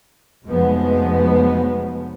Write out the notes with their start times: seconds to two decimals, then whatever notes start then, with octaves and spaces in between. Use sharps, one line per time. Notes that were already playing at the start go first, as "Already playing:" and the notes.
0.45 F1 F3 F#3 G#3 B3